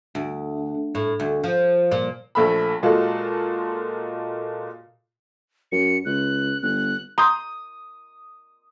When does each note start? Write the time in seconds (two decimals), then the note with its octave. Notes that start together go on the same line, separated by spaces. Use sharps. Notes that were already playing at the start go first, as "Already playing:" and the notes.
0.15 D2
0.95 A2
1.20 D2
1.44 F3
1.92 A#2
2.35 A#1 A3 E5 B5
2.83 A#2 G#3 F4 F#4 A4
5.72 F#2 C#7
6.05 C#2 F#6
6.62 G1 F#6
7.18 A#5 C6 D#6 G6